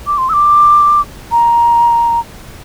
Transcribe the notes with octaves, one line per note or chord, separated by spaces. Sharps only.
D6
C6
E6
D6
A#5